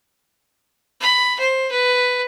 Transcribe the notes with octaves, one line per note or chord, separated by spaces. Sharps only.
B5
C5
B4